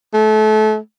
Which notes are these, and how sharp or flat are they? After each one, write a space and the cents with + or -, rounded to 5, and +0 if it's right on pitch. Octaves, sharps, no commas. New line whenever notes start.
A3 -30